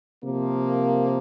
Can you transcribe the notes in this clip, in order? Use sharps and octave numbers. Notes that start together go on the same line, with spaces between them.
C3 F3 A#3